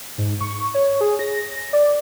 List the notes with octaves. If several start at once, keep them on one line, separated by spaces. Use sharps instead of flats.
G#2
C#6
C#5
G#4
A#6
D5